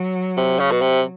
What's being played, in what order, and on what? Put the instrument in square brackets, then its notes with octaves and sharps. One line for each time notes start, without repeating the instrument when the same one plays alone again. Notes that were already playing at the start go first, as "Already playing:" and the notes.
Already playing: [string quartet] F#3
[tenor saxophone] C3
C#3
B2
C3